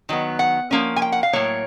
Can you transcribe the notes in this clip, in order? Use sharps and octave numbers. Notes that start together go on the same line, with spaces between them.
D#3 F#3 B3
F#5
F3 A#3 C#4
G#5
G5
F#5
F5
A2 F#3 A#3 C#5